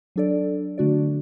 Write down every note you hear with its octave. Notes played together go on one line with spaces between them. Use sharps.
F#3 D4 A4 D5
D3 A3 D4 F#4 D5